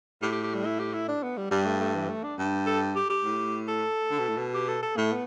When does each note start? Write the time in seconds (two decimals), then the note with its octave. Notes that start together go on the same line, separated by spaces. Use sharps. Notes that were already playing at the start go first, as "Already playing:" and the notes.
0.22 A2 G4
0.32 G4
0.43 G4
0.55 G3
0.65 E4
0.80 G4
0.94 E4
1.08 D4
1.23 B3
1.37 G3
1.51 G2 G3
1.66 A3
1.80 A3
1.95 E3
2.09 A3
2.24 D4
2.39 G2
2.66 A4
2.96 G4
3.10 G4
3.25 A2
3.68 A4
4.11 D3
4.19 B2
4.28 A2
4.37 B2
4.54 G4
4.68 A4
4.83 A4
4.97 A2 A3
5.12 B3